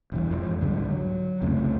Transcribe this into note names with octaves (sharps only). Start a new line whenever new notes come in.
E1 C2 E3
F2 G#2
C2 G#2 D3 G3
F#3
C2 F2 C#3 A3